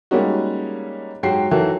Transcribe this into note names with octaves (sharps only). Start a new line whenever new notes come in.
G3 G#3 A#3 C#4 D#4 F#4
G#2 F#3 F#4 G4 G5 C7
D#3 E3 F#3 F#4 A4